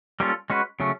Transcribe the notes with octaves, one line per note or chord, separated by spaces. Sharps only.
G3 A#3 C#4 F4 A4
G#3 C#4 F#4 B4
C#3 F#3 A3 C#4